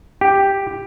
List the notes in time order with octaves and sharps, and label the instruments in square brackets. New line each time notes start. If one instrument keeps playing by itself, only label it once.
[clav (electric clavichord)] G4